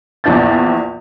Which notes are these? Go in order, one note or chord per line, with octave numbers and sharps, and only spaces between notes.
A#1 E2 F3 D4 G6 A6